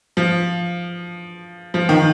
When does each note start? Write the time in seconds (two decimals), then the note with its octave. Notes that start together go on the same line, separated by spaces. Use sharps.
0.17 F3
1.74 F3
1.89 D#3